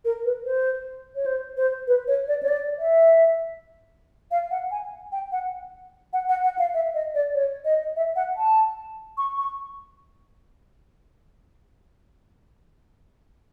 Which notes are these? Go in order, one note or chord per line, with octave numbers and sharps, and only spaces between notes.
A#4
B4
C5
C#5
C5
C5
B4
C#5
D5
C#5
D5
E5
F5
F#5
G#5
G5
F#5
F#5
F#5
F#5
F5
E5
D#5
D5
C#5
D#5
E5
F#5
A5
C#6
C#6